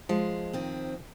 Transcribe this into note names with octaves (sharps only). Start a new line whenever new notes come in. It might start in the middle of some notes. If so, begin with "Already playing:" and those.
F3 G#3
D#3 C4